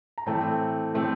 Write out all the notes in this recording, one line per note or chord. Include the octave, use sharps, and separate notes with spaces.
A#5
A2 E3 A3 C4 G5 A5
A2 E3 A3 C4